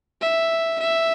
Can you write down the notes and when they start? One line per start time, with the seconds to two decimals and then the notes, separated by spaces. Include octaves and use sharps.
0.21 E5
0.80 E5